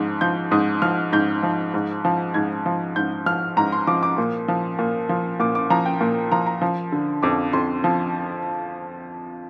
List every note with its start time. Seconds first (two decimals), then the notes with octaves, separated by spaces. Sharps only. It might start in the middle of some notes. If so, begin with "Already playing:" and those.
Already playing: G#2 F3
0.21 F3 G6
0.51 G#2 D#6
0.82 F3 F6
1.12 G#2 G6
1.43 F3
1.74 G#2
2.05 F3
2.34 G#2 G#6
2.66 F3
2.96 G#2 G6
3.26 F3 F6
3.57 G#2 A#5
3.72 C6
3.87 F3 D6
4.03 D6
4.18 A#2
4.48 F3
4.79 A#2
5.09 F3
5.40 A#2 D6
5.55 D6
5.70 F3 A#5
5.86 G5
6.01 A#2
6.32 F3 A#5
6.46 A#5
6.62 F3
6.92 D3
7.23 F2 D6
7.53 F2 C6
7.84 F3